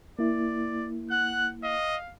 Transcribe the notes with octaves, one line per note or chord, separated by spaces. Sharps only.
A#3 E4 D5
F#5 F#6
D#5 F5